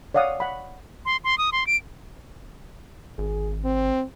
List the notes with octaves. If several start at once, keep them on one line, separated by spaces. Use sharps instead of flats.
C#5 D5 F5 F#5 D#6
F#5 B5
C6
C6
D#6
C6
D7
G#1 G#4
C4